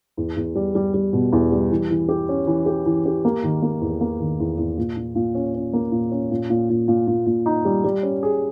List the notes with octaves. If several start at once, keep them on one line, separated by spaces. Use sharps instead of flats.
E2
E2
G3
G3
G3
B2
E2
G3
E3
E3
G4
C#4
E3
G4
E3
G4
A#3
D#3
A#3
E2
A#3
D#3
E2
E2
A#2
A#2
A#2
C#4
C#4
A#3
A#2
C#4
A#2
A#2
A#2
A#2
A#2
A#2
D#4
G3
G3
C#4
G#4